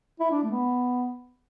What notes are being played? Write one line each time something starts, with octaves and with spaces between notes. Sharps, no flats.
E4
D4
A3
B3